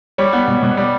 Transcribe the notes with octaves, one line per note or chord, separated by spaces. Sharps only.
G3 C#5
B3
B2
B2
G3